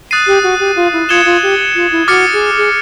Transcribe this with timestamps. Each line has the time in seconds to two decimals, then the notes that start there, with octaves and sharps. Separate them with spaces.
0.11 D#6 F#6 A6 C7 D#7
0.27 G4
0.43 F#4
0.60 G4
0.76 F4
0.93 E4
1.09 F4 D#6 G#6 C#7 E7 G7
1.26 F4
1.43 G4
1.75 F4
1.91 E4
2.08 F#4 D6 F6 A6 C#7
2.33 G#4
2.57 G#4